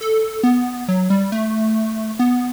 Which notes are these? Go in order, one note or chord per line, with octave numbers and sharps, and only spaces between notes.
A4
B3
F#3
G3
A3
B3